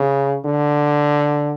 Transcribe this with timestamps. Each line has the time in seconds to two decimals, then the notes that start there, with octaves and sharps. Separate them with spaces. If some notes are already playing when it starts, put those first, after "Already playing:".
Already playing: C#3
0.45 D3